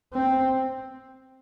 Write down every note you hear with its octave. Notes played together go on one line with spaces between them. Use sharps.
C4